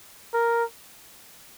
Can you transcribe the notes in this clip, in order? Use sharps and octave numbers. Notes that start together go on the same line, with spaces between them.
A#4